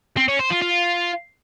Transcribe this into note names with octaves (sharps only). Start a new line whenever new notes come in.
C4
C#4
C5
F4
F4